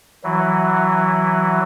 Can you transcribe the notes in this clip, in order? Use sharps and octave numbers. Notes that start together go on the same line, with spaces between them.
E3 F#3